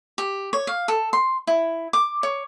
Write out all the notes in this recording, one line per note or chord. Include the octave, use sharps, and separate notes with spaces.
G4
C#5
F5
A4
C6
E4
D6
C#5